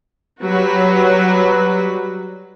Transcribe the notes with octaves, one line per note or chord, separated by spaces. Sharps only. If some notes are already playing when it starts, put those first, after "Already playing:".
F#3 G3 F#4 B4